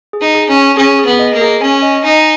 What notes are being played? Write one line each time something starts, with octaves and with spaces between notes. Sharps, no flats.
G#4
D#4
G#4
C#4
G#5
C#4 G#4
G#4
B3
D#5
A#3
G#4
C#4 G#5
D#5
D#4 G#5